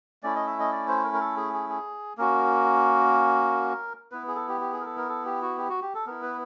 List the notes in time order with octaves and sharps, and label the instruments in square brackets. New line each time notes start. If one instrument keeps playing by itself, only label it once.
[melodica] A3 C#4 E4 D5
D#5
E5
D#5
D5
C5
A#4
A#4
A4
G#4
G#4
G#4
A#3 C#4 F#4 A#4
B3 E4 B4
G#4
A4
G4
G4
G#4
A#4
A4
A#4
A4
G4
F#4
G4
F#4
G4
A4
B3 E4 A#4
B4